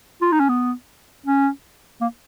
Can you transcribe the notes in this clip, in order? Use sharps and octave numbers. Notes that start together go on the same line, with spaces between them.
F4
D#4
C#4
B3
C#4
A#3